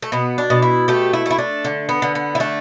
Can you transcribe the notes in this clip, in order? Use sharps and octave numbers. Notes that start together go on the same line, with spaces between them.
A3
B2 B3
D4
B2
E4
A3 G4
E4
A3 E4
D4
D3
B3
D3
B3
E4
A3 D4